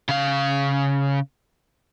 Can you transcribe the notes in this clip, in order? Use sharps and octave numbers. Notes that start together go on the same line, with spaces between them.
C#3 F5